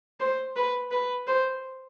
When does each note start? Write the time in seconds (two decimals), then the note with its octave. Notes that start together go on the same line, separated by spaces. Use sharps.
0.20 C5
0.56 B4
0.91 B4
1.27 C5